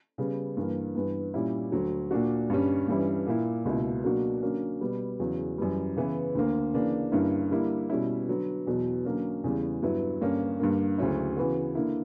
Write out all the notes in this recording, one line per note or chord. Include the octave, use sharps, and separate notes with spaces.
C#3 G3 B3
G2 E3 A#3
G2 E3 B3
A#2 G3 C#4 E4
D2 D3 F#3
A#2 A#3 D4 F#4
G2 D3 G3 C#4
G2 E3 G3 C#4 E4
A#2 A#3 E4
C#2 B2 A#3 E4
B2 F#3 A#3 D4 F#4
D3 F#3 A#3 C#4
B2 G3 B3
E2 C#3 F#3
F#2 E3 G3
C#3 E3 B3 E4
D2 D3 A#3
C#3 E3 A#3 D4
G2 D3 A#3 C#4 E4
D3 G3 A#3 E4
B2 G3 C#4 E4
D3 F#3 B3
E2 B2 F#3
D3 F#3 A#3 C#4
E2 C#3 E3 G3
G2 F#3 B3 E4
G2 D3 A#3 C#4
G2 D3 A#3
D2 C#3 F#3 C#4 E4
C#3 E3 B3 F#4
D3 A#3 E4